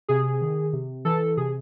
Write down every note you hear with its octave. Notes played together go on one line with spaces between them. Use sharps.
C3 G#4
D#3
C3
E3 A4
C3 G#4